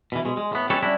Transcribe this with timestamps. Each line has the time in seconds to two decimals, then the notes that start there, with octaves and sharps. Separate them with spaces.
0.12 B2 E3
0.25 B2 G#3
0.37 G#3
0.52 A2 B3
0.70 G#3 C#4 G4 A4 B4 C#5
0.82 G3 C#4 D4 E4 F#4